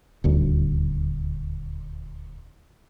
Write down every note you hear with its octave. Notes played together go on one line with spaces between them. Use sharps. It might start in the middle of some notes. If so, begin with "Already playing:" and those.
D#1 D2